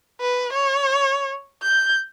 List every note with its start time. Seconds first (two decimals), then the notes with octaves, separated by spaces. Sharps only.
0.21 B4
0.53 C#5
1.63 G6